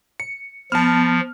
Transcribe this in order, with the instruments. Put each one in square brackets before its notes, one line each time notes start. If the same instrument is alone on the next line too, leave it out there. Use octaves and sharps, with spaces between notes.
[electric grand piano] C#7
[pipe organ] F3 [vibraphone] B3 [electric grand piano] A5 F6